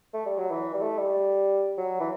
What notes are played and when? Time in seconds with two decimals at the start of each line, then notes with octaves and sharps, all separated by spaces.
0.14 A3
0.26 G3
0.38 F#3
0.51 E3
0.74 G3
0.81 A3
0.98 G3
1.78 F#3
2.00 E3